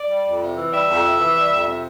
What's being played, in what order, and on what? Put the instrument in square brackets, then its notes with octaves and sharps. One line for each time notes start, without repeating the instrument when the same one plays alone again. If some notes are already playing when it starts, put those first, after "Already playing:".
Already playing: [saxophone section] D5
G3
F2
C3
E3
G3 E5
F2
C3
E3
G3
F2
C3